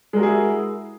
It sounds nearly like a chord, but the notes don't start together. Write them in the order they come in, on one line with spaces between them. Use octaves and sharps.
G#3 A#4 F#4 G#4 E4